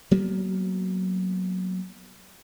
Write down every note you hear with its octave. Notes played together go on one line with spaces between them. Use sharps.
F#3 A#3 B3